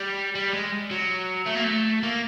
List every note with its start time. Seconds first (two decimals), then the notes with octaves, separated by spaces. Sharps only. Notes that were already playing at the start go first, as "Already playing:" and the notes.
Already playing: G3
0.35 G3
0.53 G#3
0.91 F#3
1.46 A3
1.55 A#3
1.64 A3
2.03 A#3